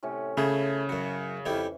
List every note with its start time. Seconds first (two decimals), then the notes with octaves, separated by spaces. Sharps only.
0.03 A2 C3 C#4
0.37 C#3 A3 G#4 B5
0.89 F#2 F#4
1.46 F2 E3 E4 G4